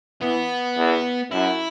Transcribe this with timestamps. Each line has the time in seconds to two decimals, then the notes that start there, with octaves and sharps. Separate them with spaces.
0.22 E3 B3
0.77 E2
1.31 F#2 E4